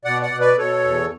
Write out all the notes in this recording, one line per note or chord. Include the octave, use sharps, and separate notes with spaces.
B2 D5 F#5
D5 F#5
B2
B4 D5
B2 A4 C#5
E2